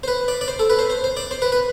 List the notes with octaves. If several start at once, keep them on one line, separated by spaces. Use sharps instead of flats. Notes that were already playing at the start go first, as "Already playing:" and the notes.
C5
B4
D5
D5
C5
A4
B4
C5
C5
C5
D5
C5
B4
B4